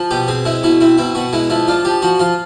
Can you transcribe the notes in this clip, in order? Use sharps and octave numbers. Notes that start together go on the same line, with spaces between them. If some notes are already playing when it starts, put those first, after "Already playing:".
Already playing: F3
B2 G4
C4 G#4
G#3 E4
B2 E4
C4 E4
B2 E4
B2 F#4
G#3 E4
F3 E4
D4 F4
F3 G4
F3 F#4
F3 F4